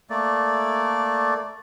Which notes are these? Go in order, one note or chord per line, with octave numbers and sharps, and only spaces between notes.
A3 A#3 D5